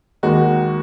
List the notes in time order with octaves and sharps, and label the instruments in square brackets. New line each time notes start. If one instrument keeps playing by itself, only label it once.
[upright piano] D#2 D#3 G#3 [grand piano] F#4